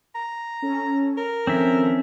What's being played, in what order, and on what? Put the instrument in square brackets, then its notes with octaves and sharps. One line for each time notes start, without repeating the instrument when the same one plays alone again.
[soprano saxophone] A#5
[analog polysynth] C#4 A4
[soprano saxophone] A#4
[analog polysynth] D#3 F3 A4 [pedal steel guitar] C4 C#4 E5